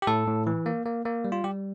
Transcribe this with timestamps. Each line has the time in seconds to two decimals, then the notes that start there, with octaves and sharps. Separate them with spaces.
0.02 G4
0.07 A2 A4
0.27 A2
0.47 E3
0.66 A#3
0.86 A#3
1.05 A#3
1.25 G3
1.32 F4
1.44 G3 G4